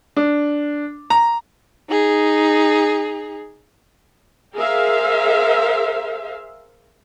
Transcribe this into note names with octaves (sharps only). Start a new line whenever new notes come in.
D4
A#5
D#4 G#4
G#4 A#4 C5 E5 F5